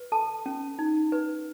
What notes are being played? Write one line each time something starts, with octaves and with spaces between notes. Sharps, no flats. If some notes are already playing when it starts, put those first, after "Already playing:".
Already playing: B4
A4 A5
C#4
D#4
B4